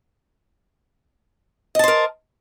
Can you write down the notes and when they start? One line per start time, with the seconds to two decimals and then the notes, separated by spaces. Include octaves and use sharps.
1.75 D#5
1.79 A5
1.84 C5
1.88 A#4